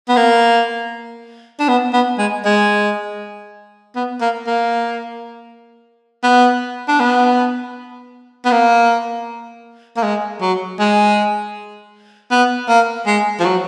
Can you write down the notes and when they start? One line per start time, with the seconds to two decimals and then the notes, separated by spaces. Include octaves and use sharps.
0.08 B3
0.16 A#3
1.60 D4
1.68 B3
1.93 B3
2.19 G#3
2.45 G#3
3.96 B3
4.21 A#3
4.47 A#3
6.23 B3
6.88 D4
7.00 B3
8.45 B3
8.51 A#3
9.97 A#3
10.03 G#3
10.41 F#3
10.80 G#3
12.31 B3
12.69 A#3
13.07 G#3
13.40 F3
13.45 F#3